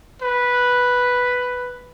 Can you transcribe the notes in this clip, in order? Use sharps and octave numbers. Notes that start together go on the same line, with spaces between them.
B4